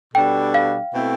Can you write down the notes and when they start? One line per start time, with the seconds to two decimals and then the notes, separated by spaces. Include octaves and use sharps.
0.14 B2 G3 D4 A4 G5
0.54 F5
0.93 B2 A3 C4 E4